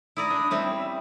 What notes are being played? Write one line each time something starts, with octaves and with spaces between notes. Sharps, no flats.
E4 D5 A#5 D#6
D4
G3 C4 C#4 E5